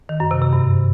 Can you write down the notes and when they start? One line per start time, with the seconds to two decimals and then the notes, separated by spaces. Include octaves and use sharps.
0.09 D#3
0.20 F#2
0.31 C3
0.42 C3
0.53 G2